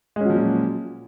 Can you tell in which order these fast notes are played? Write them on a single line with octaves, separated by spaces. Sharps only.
G#3 C#4 F#3 F3 A#2